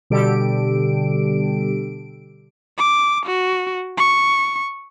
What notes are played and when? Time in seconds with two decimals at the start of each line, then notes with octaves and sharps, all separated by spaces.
0.10 B2 D3 G3 G4 A4 D7
2.78 D6
3.26 F#4
3.98 C#6